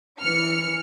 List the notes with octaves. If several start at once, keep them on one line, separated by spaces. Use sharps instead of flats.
E3 F6 C#7